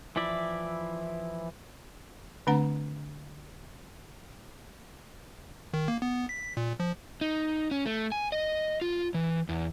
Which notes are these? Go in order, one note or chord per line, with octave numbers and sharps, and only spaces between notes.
E3 F3 E4 D5 E5
D3 A3 C4 D4 F#5 A#5
D#3
A#3
B3
B6
A#2
F3
D#4
C#4
A3
G#5
D#5
F4
E3
E2